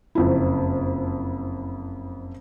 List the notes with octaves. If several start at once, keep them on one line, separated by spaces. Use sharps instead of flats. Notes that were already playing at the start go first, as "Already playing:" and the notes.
F#1 F2 E4